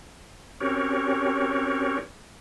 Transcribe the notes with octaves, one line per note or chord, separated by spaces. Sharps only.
C4 C#4 F#4 G4 A#4 C#5